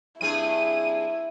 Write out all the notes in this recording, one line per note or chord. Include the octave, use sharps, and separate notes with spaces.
G2 C4 E4 G#4 D#7